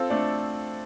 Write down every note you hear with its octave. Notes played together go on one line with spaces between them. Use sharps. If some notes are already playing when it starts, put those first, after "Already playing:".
Already playing: C4 F4 A4
A3 D4